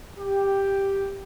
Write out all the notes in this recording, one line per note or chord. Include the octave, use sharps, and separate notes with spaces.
G4